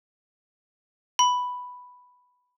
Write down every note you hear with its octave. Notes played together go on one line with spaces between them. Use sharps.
B5